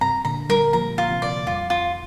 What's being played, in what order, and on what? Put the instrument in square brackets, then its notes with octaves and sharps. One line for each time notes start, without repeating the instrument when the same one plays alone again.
[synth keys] G2 C3 [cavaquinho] A#5
[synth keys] A#2 D3 [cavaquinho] A#5
[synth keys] D3 G3 [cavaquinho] A#4
[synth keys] F3 A#3 [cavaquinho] A#5
[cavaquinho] F4
[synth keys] C3 F3
[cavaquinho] D5
[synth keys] F2 [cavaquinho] F4
[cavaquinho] F4